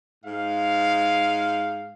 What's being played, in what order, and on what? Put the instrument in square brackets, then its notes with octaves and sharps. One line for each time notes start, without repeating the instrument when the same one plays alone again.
[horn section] G#2 F5